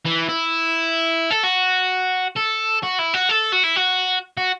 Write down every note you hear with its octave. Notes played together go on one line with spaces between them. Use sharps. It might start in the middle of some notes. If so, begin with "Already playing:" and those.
E3
E4
A4
F#4
A4
F#4
E4
F#4
A4
F#4
E4
F#4
F#4